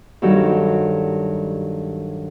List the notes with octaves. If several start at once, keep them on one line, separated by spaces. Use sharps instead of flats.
G2 D#3 F#3 G4 A4